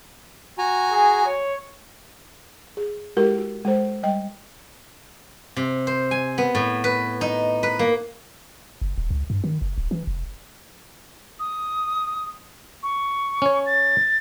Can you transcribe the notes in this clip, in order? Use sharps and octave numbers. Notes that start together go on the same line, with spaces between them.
F#4 G#5 A#5
G#4
C#5
G#4
G#3 E4 F#4 G4 A4 A#4
F#4
G#3 A4 C5
G3 D#5 G5
C3
C5
G#5
B3
A2
B4
D#4
B4
A#3
F#1
D#1
C#2
G2
D#3
F#1
D1
E3
F1
D#6
C#6
C#4 C#5
A6